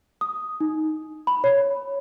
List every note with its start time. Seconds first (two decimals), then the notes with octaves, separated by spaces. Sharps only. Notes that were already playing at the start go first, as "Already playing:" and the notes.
0.21 D#6
0.60 D#4
1.27 B5
1.44 C#5